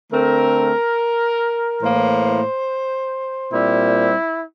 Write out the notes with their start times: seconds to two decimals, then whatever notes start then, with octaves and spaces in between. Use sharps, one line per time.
0.12 D3 A3 C4 A#4
1.82 A2 E3 A#3 C5
3.52 A#2 G3 C4 E4